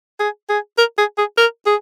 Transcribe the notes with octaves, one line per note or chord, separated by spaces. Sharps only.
G#4
G#4
A#4
G#4
G#4
A#4
G#4